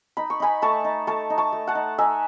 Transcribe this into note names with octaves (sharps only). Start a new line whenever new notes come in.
D#4 B5
C#6
D#4 G#5 B5
A3 A5 C#6
D#4
A3 A5 C#6
D#4
A5 C#6
A3
F#5 A5
D#4
D#4 E5 G#5